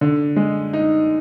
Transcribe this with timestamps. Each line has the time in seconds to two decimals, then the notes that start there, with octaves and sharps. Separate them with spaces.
0.01 D3
0.36 G#3
0.73 D#4